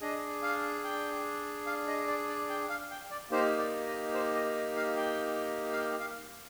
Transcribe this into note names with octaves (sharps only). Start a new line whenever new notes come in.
D4 G#4 D#5
F5
G5
F5
D#5
D5
D5
G5
F5
G5
D5
A#3 D#4 G4 C5
D5
D#5
C5
D#5
D#5
F5
G5
F5
G5
F5